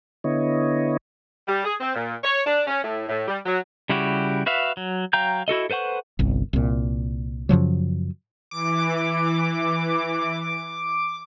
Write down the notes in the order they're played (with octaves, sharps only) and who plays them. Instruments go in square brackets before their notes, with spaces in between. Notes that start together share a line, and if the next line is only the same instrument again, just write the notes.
[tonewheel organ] D3 B3 E4 C#5 D#5
[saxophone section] G3
G#4
C4
A#2
C#5
D4
C#4
A2
A2
G3
F#3
[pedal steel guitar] C#3 G3 E4 F#4 G4
F#4 B4 E5 F5
F#3
F#3 F5 G5 A#5 G6
E4 F#4 A4 D#5
A4 B4 C5 F#5 C#6
[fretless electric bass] G1 C2
C2 A#2
F#2 C#3 F3 F#3
[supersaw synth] E3 [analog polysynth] D6